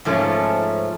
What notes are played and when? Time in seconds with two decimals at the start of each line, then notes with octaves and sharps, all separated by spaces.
0.05 G#2 F3 A3 C#4